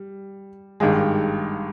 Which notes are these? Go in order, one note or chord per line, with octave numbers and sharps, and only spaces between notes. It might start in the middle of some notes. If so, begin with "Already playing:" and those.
Already playing: G3
G#1 G2 D#3 G#3 G#4